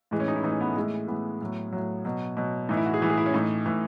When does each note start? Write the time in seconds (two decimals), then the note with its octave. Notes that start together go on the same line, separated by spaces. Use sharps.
0.11 A2 E3 G#3
0.20 C#4
0.28 D#4
0.36 E4
0.44 A2 E3 D#4
0.52 C#4
0.61 B3
0.68 A3
0.76 A2 E3 G#3
1.08 A2 E3 B3
1.41 A2 F#3
1.73 A2 F#3
2.05 B2 F#3
2.37 B2 F#3
2.69 A2 E3 D#4
2.77 E4
2.85 F#4
2.94 G#4
3.02 A2 E3
3.10 G#4
3.17 E4
3.26 C#4
3.33 A2 E3 D#4
3.66 A2 E3